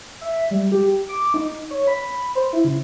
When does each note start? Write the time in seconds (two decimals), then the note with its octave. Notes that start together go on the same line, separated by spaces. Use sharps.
0.21 E5
0.51 G3
0.72 G4
1.09 D6
1.34 D#4
1.71 C#5
1.87 B5
2.35 C5
2.53 E4
2.65 C#3